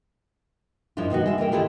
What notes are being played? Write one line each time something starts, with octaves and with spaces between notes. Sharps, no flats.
F#2 F3 G#3 D4 E4 F4
B2 D#3 D#4 F#4
G#3 E5
D#2 E3 A#4 G5
D#3 A3 E4 F4 G4 G#4